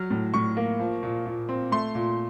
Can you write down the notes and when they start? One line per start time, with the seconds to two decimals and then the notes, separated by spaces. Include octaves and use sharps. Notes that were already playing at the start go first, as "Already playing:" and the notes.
Already playing: F#3 F6
0.10 A2
0.34 A2 C#6
0.57 A#3
0.80 F3
1.03 A#2
1.26 A#2
1.49 C4
1.72 A3 C6
1.95 A#2